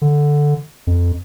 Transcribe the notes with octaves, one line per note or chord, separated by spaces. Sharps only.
D3
F2